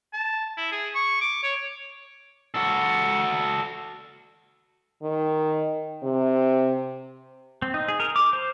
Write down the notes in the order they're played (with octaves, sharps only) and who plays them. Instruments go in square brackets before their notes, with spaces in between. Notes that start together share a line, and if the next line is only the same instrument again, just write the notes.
[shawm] A5
E4
G#4
C#6
D6
C#5
[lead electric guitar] F#4 A4
[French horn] D#3
C3
[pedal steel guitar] C4
D#4
G#4
A#4
D6
C5